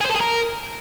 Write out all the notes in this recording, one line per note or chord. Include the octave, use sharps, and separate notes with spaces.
G#4
C5
A4
G#4
A#4